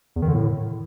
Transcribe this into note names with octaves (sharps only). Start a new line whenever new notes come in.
E2
D#3
D3
A2